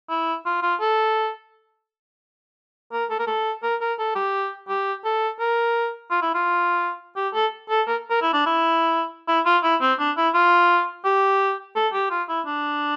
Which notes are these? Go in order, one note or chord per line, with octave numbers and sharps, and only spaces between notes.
E4
F4
F4
A4
A#4
A4
A#4
A4
A#4
A#4
A4
G4
G4
A4
A#4
F4
E4
F4
G4
A4
A4
A#4
A#4
E4
D4
E4
E4
F4
E4
C4
D4
E4
F4
G4
A4
G4
F4
E4
D4